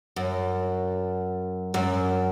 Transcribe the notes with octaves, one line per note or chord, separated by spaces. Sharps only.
F#2
F#2